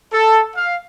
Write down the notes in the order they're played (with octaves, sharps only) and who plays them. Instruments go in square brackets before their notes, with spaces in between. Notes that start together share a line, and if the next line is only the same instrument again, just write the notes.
[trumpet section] A4
F5